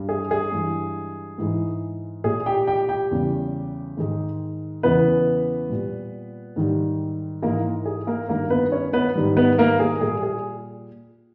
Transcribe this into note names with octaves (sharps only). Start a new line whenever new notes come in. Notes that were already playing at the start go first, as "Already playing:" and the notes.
Already playing: G2 G3
G#4
G#4
G2 E3 G#3
G#2 E3 G#3
A#2 G#3 G#4
G4 G5
G4 G5
G4 G5
E2 C#3 G3
G#2 D#3 G#3
E2 C#3 E3 G#3 B3 B4
A#2 G3
G#2 D#3 G3
G#2 E3 G#3 A#3 A#4
G#4
A#3 A#4
G2 D#3 G#3 A#3 A#4
B3 B4
C#4 C#5
B3 B4
G#2 D#3 G3
B3 B4
A#3 A#4
G#4
A#2 G3 G#4
G#4